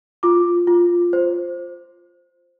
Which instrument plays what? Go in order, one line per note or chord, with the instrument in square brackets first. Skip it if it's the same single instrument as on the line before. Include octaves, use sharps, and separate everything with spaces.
[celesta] F4 D6
F4
C5